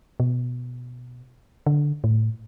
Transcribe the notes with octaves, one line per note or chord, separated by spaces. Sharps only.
B2
D3
A2